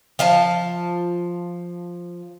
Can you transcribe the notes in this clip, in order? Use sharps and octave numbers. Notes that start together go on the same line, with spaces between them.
F3 F5 A5